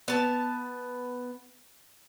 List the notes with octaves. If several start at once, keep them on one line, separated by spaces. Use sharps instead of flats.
B3 A5